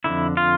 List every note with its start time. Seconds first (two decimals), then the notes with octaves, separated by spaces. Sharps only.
0.04 F2 D3 E4
0.37 F4